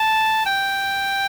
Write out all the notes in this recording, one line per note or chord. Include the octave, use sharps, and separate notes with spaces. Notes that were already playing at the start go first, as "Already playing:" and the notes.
Already playing: A5
G5